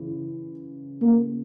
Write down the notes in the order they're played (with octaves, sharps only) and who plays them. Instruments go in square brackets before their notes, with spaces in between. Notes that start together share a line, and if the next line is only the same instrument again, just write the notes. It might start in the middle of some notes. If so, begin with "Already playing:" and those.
Already playing: [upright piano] C#3 E3
[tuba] A#3